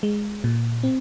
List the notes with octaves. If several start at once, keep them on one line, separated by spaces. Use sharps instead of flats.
G#3
A#2
C4